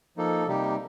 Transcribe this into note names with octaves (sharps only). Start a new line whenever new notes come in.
F3 A#3 D#4 A4
C3 G3 A#3 D#4 G4